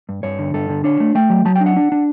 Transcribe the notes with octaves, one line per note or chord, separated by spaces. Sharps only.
G2
G2 C#5
D3
G2 A4
D3
D4 C#5
A3
A3 G5
F#3
F#3 A5
G5
D4
F#5
D4
D4